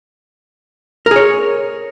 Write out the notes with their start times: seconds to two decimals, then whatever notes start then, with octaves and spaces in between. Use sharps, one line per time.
1.06 A#4
1.11 G#4
1.16 C#5